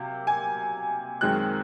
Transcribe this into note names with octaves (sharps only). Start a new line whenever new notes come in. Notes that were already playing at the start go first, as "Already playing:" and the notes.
Already playing: C3 F#3 A#3
G#5
F#2 D#3 G#3 C4 F#6